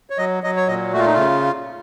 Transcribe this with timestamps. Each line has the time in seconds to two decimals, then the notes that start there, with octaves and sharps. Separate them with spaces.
0.10 C#5
0.18 F#3 D#5
0.43 F#3 D#5
0.56 C#5
0.68 A#2 D#5
0.93 A3 F#4
0.99 F4
1.06 D#4
1.14 C#3 F4